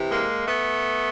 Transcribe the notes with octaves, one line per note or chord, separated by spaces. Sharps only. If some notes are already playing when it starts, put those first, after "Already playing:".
Already playing: C3 E3
G#3 A#3
A3 B3